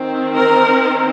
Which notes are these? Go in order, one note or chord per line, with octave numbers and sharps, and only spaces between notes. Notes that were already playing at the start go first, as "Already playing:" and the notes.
Already playing: D#3 C4
A#4